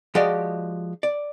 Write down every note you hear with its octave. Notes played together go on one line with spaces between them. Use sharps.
F3 G#3 F#4 G4 D5 D#5
D5